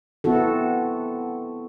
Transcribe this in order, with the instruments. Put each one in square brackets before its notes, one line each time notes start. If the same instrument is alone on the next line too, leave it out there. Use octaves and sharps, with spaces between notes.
[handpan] B3 C4 E4 F#4 A4